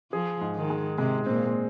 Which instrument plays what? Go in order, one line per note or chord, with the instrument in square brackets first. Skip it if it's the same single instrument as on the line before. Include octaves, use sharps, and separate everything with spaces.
[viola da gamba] F3 [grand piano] G#4
[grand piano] G#2
[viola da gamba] D#3
[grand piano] G#3
[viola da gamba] C3 [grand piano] G#3
[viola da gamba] A#2 [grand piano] C4